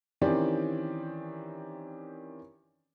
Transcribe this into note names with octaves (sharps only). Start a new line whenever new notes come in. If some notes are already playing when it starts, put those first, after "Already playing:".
D#3 E3 C4 C#4 G4 D5